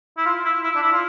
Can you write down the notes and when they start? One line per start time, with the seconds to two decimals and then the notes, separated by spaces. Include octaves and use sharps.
0.18 E4
0.26 F4
0.45 E4
0.63 E4
0.75 D4
0.82 E4
0.92 F4